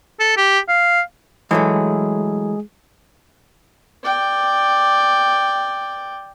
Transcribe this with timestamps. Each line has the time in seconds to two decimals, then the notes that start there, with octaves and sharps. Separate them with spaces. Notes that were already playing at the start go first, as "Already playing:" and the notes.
0.20 A4
0.37 G4
0.68 F5
1.51 E3 F#3 G#3 A3 G#4
4.04 D5 G5